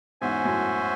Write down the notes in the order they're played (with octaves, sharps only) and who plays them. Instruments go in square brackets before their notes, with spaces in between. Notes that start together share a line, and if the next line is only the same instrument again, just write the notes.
[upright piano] E2 G#2 [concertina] C#4 F#4 C5 E5 G#5
[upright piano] F#2 A2